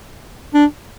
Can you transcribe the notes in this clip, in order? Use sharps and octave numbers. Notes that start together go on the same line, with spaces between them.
D4